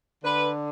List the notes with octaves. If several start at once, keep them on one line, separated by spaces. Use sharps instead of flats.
D3 B4